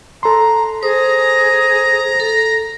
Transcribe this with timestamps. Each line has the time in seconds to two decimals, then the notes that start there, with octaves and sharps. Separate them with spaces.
0.23 A4 A#5 C6
0.83 G#4 C5 A#5 D#6
2.20 A4